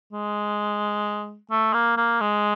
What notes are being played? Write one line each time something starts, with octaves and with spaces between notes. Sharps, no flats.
G#3
A3
A#3
A#3
G#3